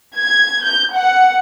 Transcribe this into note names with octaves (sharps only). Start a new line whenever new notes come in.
G#6
G6
F#5